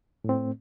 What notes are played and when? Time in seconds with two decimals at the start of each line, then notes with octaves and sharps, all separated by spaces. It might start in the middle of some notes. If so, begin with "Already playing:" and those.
0.24 A2
0.29 C4
0.34 A3